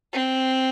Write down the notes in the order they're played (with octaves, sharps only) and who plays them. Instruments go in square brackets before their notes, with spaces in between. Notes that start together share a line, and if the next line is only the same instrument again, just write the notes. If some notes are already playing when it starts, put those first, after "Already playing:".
[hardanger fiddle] C4